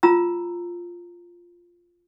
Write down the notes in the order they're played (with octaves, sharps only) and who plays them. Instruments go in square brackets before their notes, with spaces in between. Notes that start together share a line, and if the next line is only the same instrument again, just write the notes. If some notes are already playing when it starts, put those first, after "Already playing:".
[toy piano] F4 A#5 E6